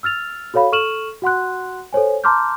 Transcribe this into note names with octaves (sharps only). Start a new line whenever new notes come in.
E6 F6 A6 F7
F#4 A4 C#5 F5 B5
A4 C#6 F6 D#7 E7 F#7
F#4 F#5 C6 F#6
A4 C5 C#5 G#5
A5 A#5 C6 D6 F6 G6